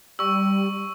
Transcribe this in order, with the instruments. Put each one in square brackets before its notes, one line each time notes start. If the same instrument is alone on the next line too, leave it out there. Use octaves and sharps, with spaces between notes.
[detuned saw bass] G3 [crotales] C#6 E6